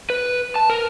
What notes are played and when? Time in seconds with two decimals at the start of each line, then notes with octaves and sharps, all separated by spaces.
0.10 B4
0.56 A5
0.70 A#4